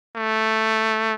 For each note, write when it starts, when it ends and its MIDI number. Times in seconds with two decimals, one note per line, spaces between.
0.16 1.14 57